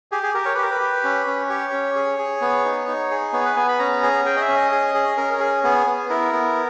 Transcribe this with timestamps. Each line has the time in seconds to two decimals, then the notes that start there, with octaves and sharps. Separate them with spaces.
0.12 G4 G#4
0.23 G#4
0.34 G4 A#4
0.45 C#5
0.55 G4 B4
0.63 A#4
0.71 B4
0.80 G4
1.04 C#4
1.27 C#4
1.49 G4 C#5
1.73 C#4
1.96 G#4
2.19 G#4
2.41 B3
2.65 D#4
2.88 D#4
3.11 G#4
3.33 B3 C#5
3.45 B4
3.56 B3 G#5
3.69 B5
3.79 C#4 A#5
4.03 G#4
4.25 G#4 G5
4.37 D#5
4.41 E5
4.48 C#4
4.56 D#5
4.72 G#4
4.95 G#4
5.17 C#4 A#4
5.33 A#4
5.40 G#4
5.64 B3 G#4
5.87 B3
6.09 E4 A#4
6.33 B3